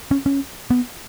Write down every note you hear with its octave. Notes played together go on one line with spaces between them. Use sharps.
C#4
C#4
B3